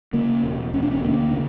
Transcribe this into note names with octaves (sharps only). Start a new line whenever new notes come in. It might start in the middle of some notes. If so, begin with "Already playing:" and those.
C#3 A#3
E1
E1 C#4
D4
C#4
D2 A#3
C#3